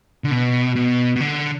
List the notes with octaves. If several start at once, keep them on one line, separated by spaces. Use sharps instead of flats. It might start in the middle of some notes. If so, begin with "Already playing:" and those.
D3
B2
B2
B2
D3